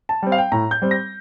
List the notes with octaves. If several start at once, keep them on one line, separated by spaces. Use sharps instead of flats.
A5
G3 C4
F5
G5
A2 A#5
G6
G3 C4
A#6